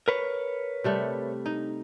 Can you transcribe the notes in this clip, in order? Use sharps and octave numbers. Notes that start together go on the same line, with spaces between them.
A#4 B4 C#5
C3 G3 A3
D#4